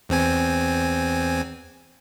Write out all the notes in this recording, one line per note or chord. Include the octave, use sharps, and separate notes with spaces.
E2 C4 G#5